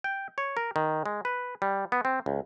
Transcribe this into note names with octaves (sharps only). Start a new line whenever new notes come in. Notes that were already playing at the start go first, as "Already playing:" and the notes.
G5
C#5
A#4
D#3
G#3
B4
G3
B3
C4
C#2